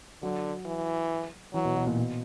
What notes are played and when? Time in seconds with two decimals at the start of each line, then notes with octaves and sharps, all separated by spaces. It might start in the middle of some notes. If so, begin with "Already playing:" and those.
0.22 D3 F#3
0.66 E3
1.54 E3 F#3
1.65 B2
1.76 B2
1.87 A#2
1.98 B2